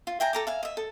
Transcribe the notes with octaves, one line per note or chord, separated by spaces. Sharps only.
F4
E5 G5 G#5 A#5
A4 A#5 D6
E5 F5 G#5
D#5 E5
A4